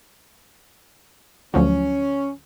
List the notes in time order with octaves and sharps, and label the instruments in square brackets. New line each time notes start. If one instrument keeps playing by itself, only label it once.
[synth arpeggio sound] D2 F3 F#3 [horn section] C#4